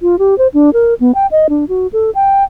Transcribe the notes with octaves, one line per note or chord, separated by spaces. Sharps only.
F4
G4
C5
D4
A#4
B3
G5
D#5
D4
F#4
A4
G5